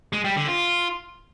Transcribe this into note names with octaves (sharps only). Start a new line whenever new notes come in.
G#3
G3
D3
F4